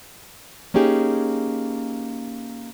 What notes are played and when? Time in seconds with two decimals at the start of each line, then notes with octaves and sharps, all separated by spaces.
0.74 A#3 C#4 D#4 G4 G#4